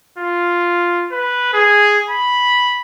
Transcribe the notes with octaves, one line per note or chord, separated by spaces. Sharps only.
F4
B4
G#4
B5